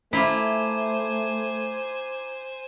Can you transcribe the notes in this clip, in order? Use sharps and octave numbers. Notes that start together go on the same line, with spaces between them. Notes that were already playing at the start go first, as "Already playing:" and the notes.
A3 E4 F4 C5 G#5 A#5 D6